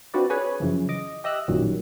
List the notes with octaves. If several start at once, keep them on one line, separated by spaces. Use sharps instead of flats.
C4 D4 F4 F#4 B4 D5
G#4 B4 C#5 G#5
F#2 C#3 E3 F3
D#5 D6
G4 D#5 E5 E6 F#6
A1 F#2 A#2 D#3 F#3 G3